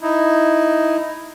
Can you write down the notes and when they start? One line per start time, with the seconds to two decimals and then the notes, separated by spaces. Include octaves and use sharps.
0.01 D#4 E4